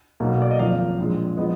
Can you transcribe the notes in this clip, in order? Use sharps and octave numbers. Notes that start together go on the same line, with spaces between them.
B1 B2 A#3
D5
D#5
G#1 F#2 F3 A#3 F5
A#1 A#2 G#3
F3 G#3 B3 D#5